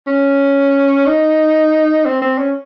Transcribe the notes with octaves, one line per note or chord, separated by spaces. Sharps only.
C#4
D#4
C4
C4
C#4